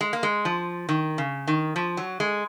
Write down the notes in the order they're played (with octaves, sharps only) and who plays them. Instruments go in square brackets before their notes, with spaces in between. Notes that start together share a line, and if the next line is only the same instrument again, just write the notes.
[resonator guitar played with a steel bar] G#3
A#3
G#3
F3
D#3
C#3
D#3
F3
F#3
G#3